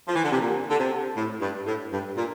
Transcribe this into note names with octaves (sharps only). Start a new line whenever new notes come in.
F3
E3
D3
C3
A#2
D3
C3
A2
G2
A2
G2
A#2